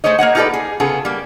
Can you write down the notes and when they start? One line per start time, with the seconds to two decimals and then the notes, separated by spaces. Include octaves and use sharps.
0.04 A3 G#4 C5 C#5 D#5
0.19 A#3 C#5 D#5 F#5
0.35 D#4 F4 G4 A4 B4 D5
0.54 G#4
0.80 C#3 B3 F4 G#4 A4
1.05 G3 A#3